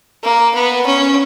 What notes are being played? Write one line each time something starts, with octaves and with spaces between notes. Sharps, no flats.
A#3
B3
C#4